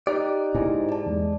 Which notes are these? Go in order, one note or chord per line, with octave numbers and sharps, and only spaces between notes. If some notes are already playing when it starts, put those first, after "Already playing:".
D#4 G4 D5 F#6
G#2 E4 G#5
D5 A5
E2 G#3